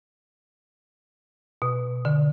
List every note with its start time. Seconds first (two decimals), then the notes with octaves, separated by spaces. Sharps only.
1.62 B2
2.05 D3